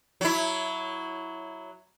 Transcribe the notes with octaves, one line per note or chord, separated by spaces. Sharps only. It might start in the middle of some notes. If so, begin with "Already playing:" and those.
F#3 E4